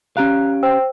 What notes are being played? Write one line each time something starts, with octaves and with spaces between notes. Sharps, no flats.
C#4 G4 F5 A#5 F#6
C5 G5 E6